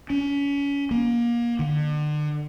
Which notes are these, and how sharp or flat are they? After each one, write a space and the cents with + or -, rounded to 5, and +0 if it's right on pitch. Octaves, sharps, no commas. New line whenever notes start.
C#4 +30
A#3 +25
D3 +35